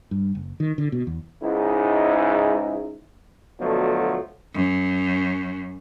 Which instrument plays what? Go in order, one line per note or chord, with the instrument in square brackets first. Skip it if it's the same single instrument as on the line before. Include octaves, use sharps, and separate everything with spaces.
[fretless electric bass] G2
F#1
D#3
D3
B2
E2
[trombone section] C#2 G#2 D#4 E4
B2 D3 F3 F#3 A3
[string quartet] F#2